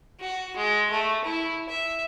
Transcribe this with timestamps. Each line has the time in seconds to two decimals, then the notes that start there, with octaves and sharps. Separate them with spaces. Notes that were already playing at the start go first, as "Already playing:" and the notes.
0.20 F#4
0.56 G#3
0.91 A3
1.24 E4
1.69 E5